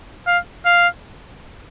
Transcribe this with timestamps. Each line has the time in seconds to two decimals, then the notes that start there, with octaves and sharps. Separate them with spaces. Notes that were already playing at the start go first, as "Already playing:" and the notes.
0.27 F5
0.65 F5